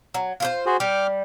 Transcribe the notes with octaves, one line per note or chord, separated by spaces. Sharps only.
F#3
F4 F#4 C5
F#4 G#4 C5
G3 G5 D6 F6